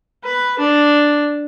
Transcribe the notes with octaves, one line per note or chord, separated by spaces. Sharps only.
B4
D4